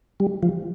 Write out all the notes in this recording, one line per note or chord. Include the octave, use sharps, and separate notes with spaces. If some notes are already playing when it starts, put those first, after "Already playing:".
G3
F3